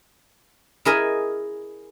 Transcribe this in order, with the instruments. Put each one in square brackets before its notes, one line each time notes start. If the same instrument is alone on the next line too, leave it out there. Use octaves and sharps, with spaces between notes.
[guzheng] E4 G#4 A#4 D#5